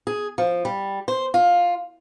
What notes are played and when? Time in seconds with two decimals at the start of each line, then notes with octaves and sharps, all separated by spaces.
0.07 G#4
0.38 F3
0.65 G3
1.08 C5
1.34 F4